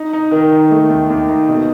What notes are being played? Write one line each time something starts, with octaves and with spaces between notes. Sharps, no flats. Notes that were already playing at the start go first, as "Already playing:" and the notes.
Already playing: D#4
D#4
D#3
D#4
A3
D#2
D#2
D#4
B2